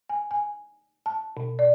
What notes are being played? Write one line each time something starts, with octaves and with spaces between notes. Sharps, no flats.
G#5
G#5
A5
B2
D5